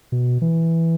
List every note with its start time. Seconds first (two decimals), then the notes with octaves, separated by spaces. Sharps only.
0.12 B2
0.42 E3